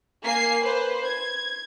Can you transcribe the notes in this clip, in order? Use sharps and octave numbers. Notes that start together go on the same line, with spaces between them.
A#3 G#5 C7
B4 C5
G#6